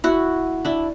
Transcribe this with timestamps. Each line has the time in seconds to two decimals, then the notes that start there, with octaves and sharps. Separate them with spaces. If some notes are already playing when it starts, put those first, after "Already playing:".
0.04 E4 F#4
0.65 D4 E4